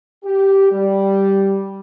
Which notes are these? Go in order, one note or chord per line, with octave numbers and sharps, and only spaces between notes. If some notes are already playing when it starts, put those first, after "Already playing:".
G4
G3